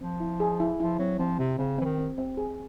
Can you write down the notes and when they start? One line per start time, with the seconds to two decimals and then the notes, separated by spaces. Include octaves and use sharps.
0.01 F3 C4
0.20 E4
0.40 G#4
0.60 E4
0.80 F3 E4
0.99 F#3 C4
1.19 F3 C4
1.39 C3 C4
1.58 C#3 C4
1.78 E3 C4
1.85 D#3
1.98 C4
2.18 C4
2.37 G#4